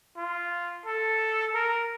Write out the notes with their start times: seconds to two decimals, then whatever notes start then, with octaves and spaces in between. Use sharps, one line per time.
0.17 F4
0.86 A4
1.54 A#4